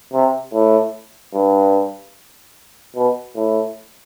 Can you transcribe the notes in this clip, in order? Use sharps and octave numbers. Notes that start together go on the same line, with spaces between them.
C3
A2
G2
B2
A2